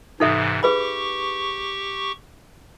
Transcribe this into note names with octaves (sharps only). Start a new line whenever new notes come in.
G#2 C3 E3 D#4 A4 E5
G4 G#4 B4 B5 C#6